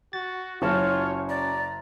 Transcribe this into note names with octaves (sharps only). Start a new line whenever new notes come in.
F#4 A6
F#1 C#4 F4 F#4 C#5 A5
D5 A#5